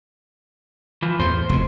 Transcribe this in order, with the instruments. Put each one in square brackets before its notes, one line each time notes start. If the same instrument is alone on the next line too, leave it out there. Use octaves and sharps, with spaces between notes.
[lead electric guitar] E3 F3
[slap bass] E2 A2 [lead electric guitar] C5
[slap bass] F1 E2 B2